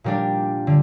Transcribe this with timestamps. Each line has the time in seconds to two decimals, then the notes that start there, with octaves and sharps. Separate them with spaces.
0.04 A#2 G3 D4 G4 A#4
0.67 D3